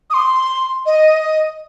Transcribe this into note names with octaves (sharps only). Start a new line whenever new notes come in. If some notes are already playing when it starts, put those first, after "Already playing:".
D#6
C6
D#5